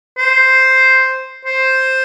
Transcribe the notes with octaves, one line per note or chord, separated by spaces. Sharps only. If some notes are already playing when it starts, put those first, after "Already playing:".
C5
C5